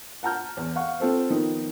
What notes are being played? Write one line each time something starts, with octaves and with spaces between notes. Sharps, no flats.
F#5 A5 A#5 F6 G6
E2
F5 F#5 C#6
C4 F4 A4 C5
D#3 F3 B3 D#4